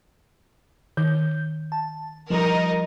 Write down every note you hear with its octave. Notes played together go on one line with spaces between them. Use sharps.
D#3 G6
A5
F3 G3 D#4 A#4 D#5 A#6